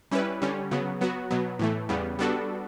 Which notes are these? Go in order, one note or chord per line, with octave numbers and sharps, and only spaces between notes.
G3 C#4 E4 B4
D3 G3 C#4
C#3 F#3 B3
F#3 B3 F#4
B2 F#3 B3
A2 E3 A3
E2 C#3 G3 B3
G3 B3 D4 F#4 A4